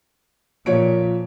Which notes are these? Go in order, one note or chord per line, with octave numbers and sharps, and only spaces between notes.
A#2 F3 C#5 D7